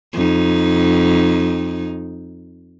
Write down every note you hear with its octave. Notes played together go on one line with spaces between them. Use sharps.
F2 D#4